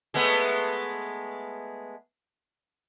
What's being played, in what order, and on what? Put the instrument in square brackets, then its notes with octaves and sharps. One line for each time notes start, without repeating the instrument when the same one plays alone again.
[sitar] G#3 A3 B3